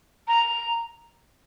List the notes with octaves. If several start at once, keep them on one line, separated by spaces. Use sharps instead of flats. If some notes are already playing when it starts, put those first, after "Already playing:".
A#5